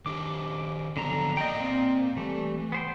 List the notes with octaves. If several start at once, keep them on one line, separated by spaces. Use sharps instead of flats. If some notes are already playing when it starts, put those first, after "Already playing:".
D#3 D4 G4 D6
D3 F3 F#3 B3 A#5
A#3 D5 D#5 G5 A#5
C4
E3 G3 A3
B3 C5 G5